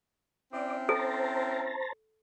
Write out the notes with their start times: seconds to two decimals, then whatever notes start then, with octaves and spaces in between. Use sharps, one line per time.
0.53 C4 C#4 E4 D5
0.89 A4 C5 A5 A#5